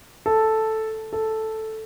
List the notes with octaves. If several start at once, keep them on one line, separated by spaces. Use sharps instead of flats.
A4
A4